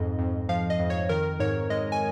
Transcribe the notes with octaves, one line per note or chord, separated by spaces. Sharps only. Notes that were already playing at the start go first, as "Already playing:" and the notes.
Already playing: F2 G#2 D#5
F2
F3 F5
D#5
F2
C#5
D#3 A#4
G#2 C#5
G#3 D#5
G#5